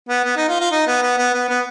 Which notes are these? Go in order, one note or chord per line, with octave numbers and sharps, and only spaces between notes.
B3
B3
D#4
F4
F4
D#4
B3
B3
B3
B3
B3